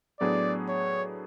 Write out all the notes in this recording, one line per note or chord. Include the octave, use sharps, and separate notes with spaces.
A2 F#3 B3 D4 G#4 D5
C#5